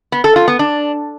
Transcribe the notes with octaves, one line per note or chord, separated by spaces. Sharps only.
B3
A4
F4
B3
D4